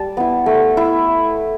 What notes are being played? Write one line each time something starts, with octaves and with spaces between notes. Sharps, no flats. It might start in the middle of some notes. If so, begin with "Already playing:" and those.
Already playing: G3 A5
B3 E4
A3
E4